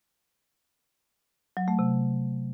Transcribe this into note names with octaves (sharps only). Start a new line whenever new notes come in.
F#3
A3
C3